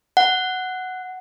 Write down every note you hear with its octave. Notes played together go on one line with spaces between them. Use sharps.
F#5